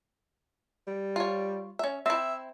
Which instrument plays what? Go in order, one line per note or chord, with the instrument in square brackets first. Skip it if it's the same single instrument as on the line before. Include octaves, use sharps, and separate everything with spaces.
[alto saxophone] G3
[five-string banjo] F4 C#5
C#4 E5
[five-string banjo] C4 E4 [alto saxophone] E5